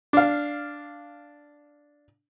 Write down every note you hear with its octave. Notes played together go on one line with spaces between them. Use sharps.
D4 F5